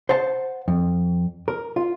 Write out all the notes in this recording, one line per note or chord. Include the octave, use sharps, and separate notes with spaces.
C5 F#5 A5
F2
A#4
F4